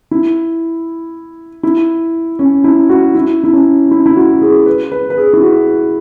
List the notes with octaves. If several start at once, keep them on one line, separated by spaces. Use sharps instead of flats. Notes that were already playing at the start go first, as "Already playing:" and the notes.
E4
E4
C#4
E4
F#4
E4
E4
C#4
E4
E4
F#4
G#4
B4
B4
B4
G#4
E4
F#4